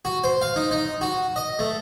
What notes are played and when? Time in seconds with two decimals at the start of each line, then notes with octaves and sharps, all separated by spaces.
0.05 F#4
0.24 C5
0.42 F5
0.56 D#4
0.71 D#4
1.01 F#4
1.36 D#5
1.59 A3